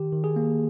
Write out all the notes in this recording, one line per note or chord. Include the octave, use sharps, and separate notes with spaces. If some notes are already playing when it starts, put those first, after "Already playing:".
Already playing: D#3 G4
D#3
G#4
A#3